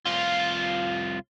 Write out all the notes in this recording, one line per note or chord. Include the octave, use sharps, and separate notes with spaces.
C2 F4